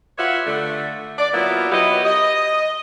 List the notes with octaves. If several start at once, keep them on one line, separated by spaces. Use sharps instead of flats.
F4 G4 B4 C#5 E5 F#5
D3 A3
D5
F#3 A#3 B3 E4 F4
F#3 B3 E4 F#4 G4 D#5
D#5